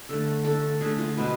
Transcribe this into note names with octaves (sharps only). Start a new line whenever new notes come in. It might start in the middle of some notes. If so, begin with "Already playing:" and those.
D3 A3 A4
D3 A3 A4
D3 A3 G#4
F4
B2 G#3 B3